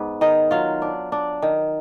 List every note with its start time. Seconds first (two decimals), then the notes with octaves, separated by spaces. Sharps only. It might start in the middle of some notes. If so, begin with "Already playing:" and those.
Already playing: G#2 B3 B4
0.21 D#3 D#4 D#5
0.51 F#3 F4 F5
0.82 D4
1.12 D4
1.42 D#3